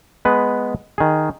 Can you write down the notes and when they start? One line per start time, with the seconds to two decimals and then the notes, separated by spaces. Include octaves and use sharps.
0.25 G#3 B3 B4
0.98 D#3 G#4